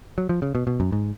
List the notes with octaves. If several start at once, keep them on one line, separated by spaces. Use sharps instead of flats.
F#3
F3
C#3
B2
B2
F#2
G#2